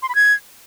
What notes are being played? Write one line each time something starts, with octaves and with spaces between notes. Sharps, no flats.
C6
B5
G#6